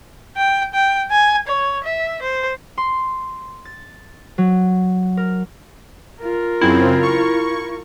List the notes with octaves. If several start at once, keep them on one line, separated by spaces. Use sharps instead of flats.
G5
G5
G#5
C#5
E5
C5
C6
A6
F#3
A#4
F4 A#4
F#2 C#3 C4 E4
C#6